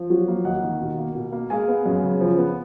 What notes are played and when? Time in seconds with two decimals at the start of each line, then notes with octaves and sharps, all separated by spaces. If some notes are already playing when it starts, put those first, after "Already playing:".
Already playing: F3
0.10 F#3
0.28 A#3
0.45 D#2 D#5 F#5
0.63 D#3
0.81 B2
0.98 A#3
1.15 B2
1.32 A#3
1.50 G#3 F5 G#5
1.68 B3
1.86 F#2
2.03 C#3
2.20 F3
2.38 B3